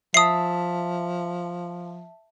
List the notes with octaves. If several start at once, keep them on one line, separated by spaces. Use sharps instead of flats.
F3 E5 A5 D#6 C7